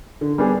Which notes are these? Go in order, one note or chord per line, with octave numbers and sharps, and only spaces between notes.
D3
G3 B3 D4 G#4